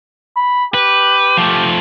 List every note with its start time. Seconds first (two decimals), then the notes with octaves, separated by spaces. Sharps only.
0.36 B5
0.74 G4 B4
1.37 F3 A3